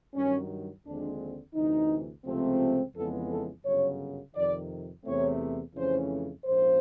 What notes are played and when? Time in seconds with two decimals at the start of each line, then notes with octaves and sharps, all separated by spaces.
0.15 G2 D#3 F#3 C#4
0.85 D#2 D3 F3 G#3 C4 D4
1.54 D2 C3 E3 D#4
2.25 C#2 C3 F3 A3 C4
2.95 F2 C#3 E3 G#3 B3 A4
3.29 A4
3.65 G1 F#2 C#3 F#3 C#5
4.35 F2 C3 D#3 D5
5.05 E2 C3 E3 A3 C4 C#5
5.75 F2 C#3 E3 A3 C#4 C5
6.45 A#1 G#2 F3 A#3 C#4 C5